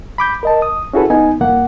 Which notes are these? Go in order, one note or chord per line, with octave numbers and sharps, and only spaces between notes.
B5 D6 G6
A#4 D#5 A5
D#6
C#4 E4 F#4 G#4 A4 B4
B3 D#4 G#5
C2 F2 A#3 F#5